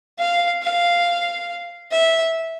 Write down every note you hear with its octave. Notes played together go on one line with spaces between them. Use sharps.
F5
F5
E5